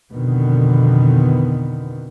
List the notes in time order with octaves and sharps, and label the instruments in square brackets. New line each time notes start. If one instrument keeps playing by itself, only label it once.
[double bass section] F2 B2 D3 D#3 B3